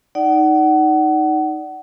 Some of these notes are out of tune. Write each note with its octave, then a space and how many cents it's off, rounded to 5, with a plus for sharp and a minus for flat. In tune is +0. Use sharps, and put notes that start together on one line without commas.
D#4 +0 D5 +0 F#5 +25